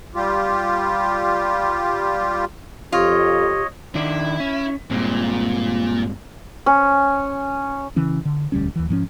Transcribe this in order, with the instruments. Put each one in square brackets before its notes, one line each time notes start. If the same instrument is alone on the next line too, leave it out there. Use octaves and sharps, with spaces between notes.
[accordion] G3 F4 G4
[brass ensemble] F2 [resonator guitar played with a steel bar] F4 [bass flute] G4 [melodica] C#5 D#5
[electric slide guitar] D#3 D4 [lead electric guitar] E4
[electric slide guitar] C#4
[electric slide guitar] G2 G#3 C4 [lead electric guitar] A#2
[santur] C#4
[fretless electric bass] C#3 E3 C#4
D3
E1 D2 G3 C#4
D#2 E3
G#2 F3 A#3 C#4